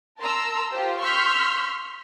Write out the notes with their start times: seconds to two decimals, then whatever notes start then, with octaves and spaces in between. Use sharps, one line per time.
0.20 A#4 A5 A#5 C6 E6
0.73 F4 G4 C5
1.01 C6 C#6 E6 F6 G6 B6